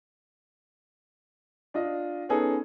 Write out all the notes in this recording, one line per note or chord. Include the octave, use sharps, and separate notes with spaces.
D4 F4 D#5
B3 C#4 D#4 G#4 A4